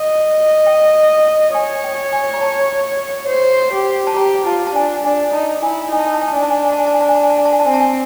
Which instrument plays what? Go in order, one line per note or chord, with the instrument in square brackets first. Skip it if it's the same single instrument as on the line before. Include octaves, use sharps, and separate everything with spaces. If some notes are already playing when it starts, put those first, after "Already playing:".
Already playing: [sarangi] D#5
[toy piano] G5
[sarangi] C#5 [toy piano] G#5
[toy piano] G5
G#5
A#5
A5
[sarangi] C5
G4
[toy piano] A5
[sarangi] G4 [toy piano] A#5
[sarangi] F4 [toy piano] A5
[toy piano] A5
[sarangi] D4 [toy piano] G#5
[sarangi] D4 [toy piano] G#5
[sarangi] D#4 [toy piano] A5
[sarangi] E4 [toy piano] G#5
[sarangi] D#4 [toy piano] G#5
[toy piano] A5
G#5
A5
G#5
A5
[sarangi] D4 [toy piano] G#5
[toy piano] A5
G#5
A5
G#5
A5
G#5
A5
G#5
A5
G#5
A5
G#5
A5
G#5
A5
G#5
A5
[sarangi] C4 [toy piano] G#5
[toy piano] A5
G#5